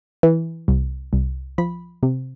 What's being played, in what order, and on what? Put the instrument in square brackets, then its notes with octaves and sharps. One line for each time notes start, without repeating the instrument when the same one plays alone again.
[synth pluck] E3
C2
C2
F3 B5
C3